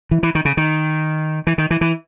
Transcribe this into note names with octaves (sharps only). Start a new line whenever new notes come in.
E3
E3
D#3
C#3
D#3
E3
D#3
E3
E3